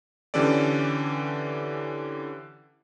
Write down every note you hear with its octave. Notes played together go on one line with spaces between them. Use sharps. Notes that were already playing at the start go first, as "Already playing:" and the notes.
D3 E3 C#4 G4 A4 D5